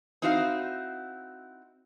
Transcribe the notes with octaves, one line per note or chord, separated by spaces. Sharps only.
C4 D#4 E4 F#4 C#5 F5